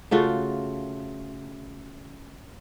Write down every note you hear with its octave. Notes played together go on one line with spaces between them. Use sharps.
C#3 A3 F4 F#4